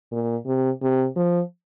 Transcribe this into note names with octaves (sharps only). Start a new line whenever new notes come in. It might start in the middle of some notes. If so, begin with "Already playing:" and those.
A#2
C3
C3
F3